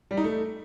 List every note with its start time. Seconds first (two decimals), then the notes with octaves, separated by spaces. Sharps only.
0.11 G3
0.17 D#4
0.24 A3